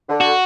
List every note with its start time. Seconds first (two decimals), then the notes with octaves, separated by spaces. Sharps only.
0.09 D3
0.21 F#4